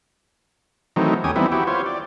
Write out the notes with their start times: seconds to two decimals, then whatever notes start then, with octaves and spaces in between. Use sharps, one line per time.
0.96 D#3 E3 F#3 A3 C4 D#4
1.24 D#2 C#4 G4 G#5 D#6
1.36 E3 G3 B3 C4 D#4 E4
1.52 E4 F#4 G4
1.67 F4 C5 C#5
1.86 D5